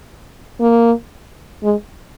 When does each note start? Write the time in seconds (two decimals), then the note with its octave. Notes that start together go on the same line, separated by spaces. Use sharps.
0.61 A#3
1.64 G#3